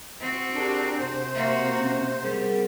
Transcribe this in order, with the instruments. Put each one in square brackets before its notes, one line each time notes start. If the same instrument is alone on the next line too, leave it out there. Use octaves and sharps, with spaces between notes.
[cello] C4 F#4
[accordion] D4 [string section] G4 G#4 A#4
[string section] C3 [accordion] C5
[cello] A#3 F#4 [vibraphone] E5
[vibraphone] C#4
[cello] G3 [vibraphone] G#4 A#4 F#5